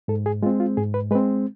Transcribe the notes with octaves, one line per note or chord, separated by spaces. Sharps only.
G#2 A4
G#4
G#3 C4 F4
F4
G#2 G#4
B4
G#3 C4 B4